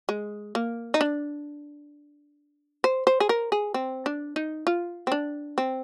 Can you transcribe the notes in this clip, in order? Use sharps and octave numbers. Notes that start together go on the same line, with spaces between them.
G#3
A#3
D#4
D4
C5
C5
G#4
A#4
G#4
C4
D4
D#4
F4
C4
D4
C4